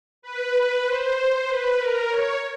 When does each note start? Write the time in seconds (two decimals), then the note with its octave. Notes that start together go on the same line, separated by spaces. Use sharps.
0.22 B4
0.85 C5
1.47 B4
1.78 A#4
2.09 C#5